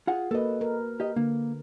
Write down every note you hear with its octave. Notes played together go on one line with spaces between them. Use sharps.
F4 G#4 F#5
A#3 F#4 A4 B4 D#5
A#4
G4 D#5
D3 A#3